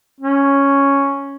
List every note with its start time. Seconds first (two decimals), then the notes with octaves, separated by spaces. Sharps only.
0.20 C#4